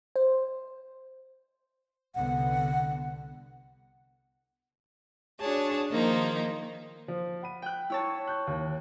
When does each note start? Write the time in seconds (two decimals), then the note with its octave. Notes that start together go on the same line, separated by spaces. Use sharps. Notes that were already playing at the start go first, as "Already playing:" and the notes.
0.16 C5
2.15 C2 D3 B3 F#5
5.40 D4 F#4 G#4 C#5 A5
5.90 D#3 F3 A#3 D#4 C5
7.08 F3
7.42 F#5 B5 D#7
7.62 G5 F#6
7.90 E4 C#5 A5
8.28 F#6 G6
8.47 D#2